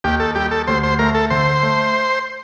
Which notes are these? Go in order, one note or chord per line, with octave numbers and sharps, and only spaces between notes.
D#2 G4
A4
G3 G4
A4
D2 C5
C5
A3 A#4
A4
D3 C5
A3